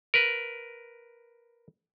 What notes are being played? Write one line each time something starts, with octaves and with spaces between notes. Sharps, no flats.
A#4 B4